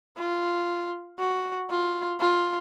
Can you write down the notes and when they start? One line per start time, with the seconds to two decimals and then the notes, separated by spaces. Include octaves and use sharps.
0.18 F4
1.19 F#4
1.70 F4
2.20 F4